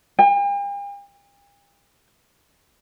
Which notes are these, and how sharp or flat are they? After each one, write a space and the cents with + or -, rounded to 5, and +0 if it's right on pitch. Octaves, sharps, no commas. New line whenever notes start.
G5 +45